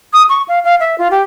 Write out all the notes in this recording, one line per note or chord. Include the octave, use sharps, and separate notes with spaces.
D#6
C#6
F5
F5
E5
F4
G4